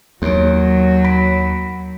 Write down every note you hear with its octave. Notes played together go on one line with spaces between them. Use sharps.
D#2 F#3 A#3 C#5 D7
B5 B6 D7